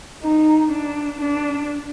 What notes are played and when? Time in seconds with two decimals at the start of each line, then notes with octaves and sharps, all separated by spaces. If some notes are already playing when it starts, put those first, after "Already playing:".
0.24 D#4
0.72 D4
1.21 D4